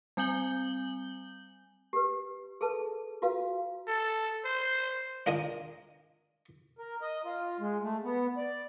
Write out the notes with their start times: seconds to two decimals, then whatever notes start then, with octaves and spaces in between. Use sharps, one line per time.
0.17 G3 C4 G#5 G6 F#7 G7
1.93 G4 B4
2.61 G#4 A4 B4 A5
3.22 F4 F#4 B4 F5
3.88 A4
4.45 C5
5.26 D4 F4 A#4 D#5 G#5 D6
6.79 A#4
7.02 D#5
7.25 F4
7.60 G#3
7.82 A3
8.03 B3
8.37 D5